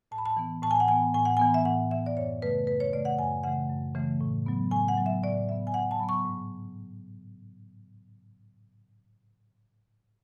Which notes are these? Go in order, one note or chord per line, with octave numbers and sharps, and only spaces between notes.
A2 A5
B5
A5
E3 B3
A2 A5
G#5
F#5
E3 B3 G#5
A2 G#5
F#5
E3 B3 G#5
E5
A2 F#5
E3 B3 E5
D5
F#2 C#5
C#3 E3 A3 B4
F#2 B4
C#5
C#3 E3 A3 D5
F#5
F#2 G#5
C#3 E3 A3 F#5
F#2
C#3 E3 A3
A2
F#3 B3
A2 G#5
F#5
F#3 B3
E5
A2 D5
F#3 B3 E5
G#5
A2 F#5
A5
F#3 B3 B5
C#6
G#2